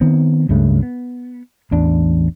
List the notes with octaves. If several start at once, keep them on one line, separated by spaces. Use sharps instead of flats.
D#3 B3 C4
C#2 G2 C#3 A3
B3
A1 E2 D4